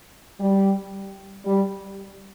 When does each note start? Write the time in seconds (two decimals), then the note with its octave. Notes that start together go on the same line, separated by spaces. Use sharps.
0.40 G3
1.46 G3